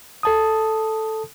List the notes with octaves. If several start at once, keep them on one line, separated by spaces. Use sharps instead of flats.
A4 A5 D#6